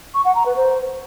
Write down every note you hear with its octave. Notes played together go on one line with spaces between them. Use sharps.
C#6
F#5
A#5
B4
C5